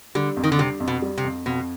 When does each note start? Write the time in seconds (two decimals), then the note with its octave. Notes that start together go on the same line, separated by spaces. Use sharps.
0.15 D3 G3
0.37 F2
0.44 D#3
0.52 D3
0.59 C3 G3
0.80 F2
0.88 B2
1.02 G3
1.18 C3
1.24 F2
1.46 F2 B2